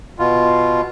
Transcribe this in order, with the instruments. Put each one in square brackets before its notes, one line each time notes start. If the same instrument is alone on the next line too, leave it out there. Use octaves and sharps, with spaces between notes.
[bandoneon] B2 F4